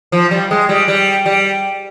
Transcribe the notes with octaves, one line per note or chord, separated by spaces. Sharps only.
F3
G3
G#3
G3
G3
G3